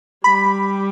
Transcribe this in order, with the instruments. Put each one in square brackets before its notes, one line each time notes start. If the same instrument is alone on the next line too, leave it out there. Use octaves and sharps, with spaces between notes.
[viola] G3 [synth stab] B5